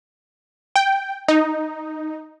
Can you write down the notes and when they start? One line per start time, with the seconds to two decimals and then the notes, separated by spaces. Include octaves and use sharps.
0.76 G5
1.28 D#4